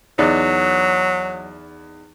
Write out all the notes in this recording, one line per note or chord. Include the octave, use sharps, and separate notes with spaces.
E2 F#3 D#4 D5